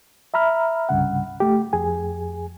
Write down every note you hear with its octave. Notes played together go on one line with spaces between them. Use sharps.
E5 A#5 B5 F6
C2 G2 C#3 F#5
A3 G4
F2 G#4 G#5